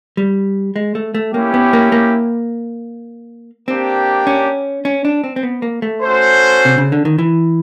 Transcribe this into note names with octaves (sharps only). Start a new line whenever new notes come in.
G3
G#3
A3
A3
A#3 C#4 E4 G4
B3
A#3
A#3
A#3 C4 D4 G4
C#4
C#4
D4
C4
C4
B3
A#3
A3
C#4 F#4 A4 C5
C3
C#3
D3
D#3
E3